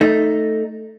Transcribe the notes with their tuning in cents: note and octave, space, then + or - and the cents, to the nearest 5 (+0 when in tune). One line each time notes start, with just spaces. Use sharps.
A3 +0 D#4 +0